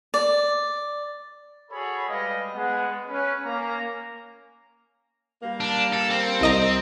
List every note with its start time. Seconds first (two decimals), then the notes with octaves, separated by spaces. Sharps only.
0.14 D5
1.71 F#4 G#4 A4 C#5 B5
2.08 G3 G#3 G4 B4 D#5 F5
2.53 G#3 B3 F#5
3.07 C#4 B4
3.44 A#3 C#4 A#5
5.43 G3 A#3
5.60 D4
5.93 A4
6.11 C4
6.41 C2 D#5 A#5